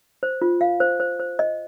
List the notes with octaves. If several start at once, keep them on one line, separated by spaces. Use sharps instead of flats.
C5
F4
F5
C5
C5
C5
D#5